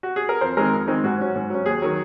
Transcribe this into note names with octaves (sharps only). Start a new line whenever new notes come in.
F#4
G#4
A#4
F2 C5
D#3 G#3 C4 D#4 A#4
F2
D#3 G#3 C4 D#4
G#2 F#4
F#3 C#4
G#2
F#3 C#4
D#2 G#4
D#3 F#3